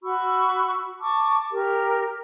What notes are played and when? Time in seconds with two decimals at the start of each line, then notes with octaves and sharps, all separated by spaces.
0.04 F#4 B5 C#6 E6
0.99 A5 C#6 D6
1.51 G4 A#4